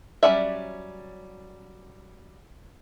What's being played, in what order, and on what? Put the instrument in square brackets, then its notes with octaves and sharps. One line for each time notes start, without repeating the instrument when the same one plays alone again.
[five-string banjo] F#3 G3 C#4 D5 E5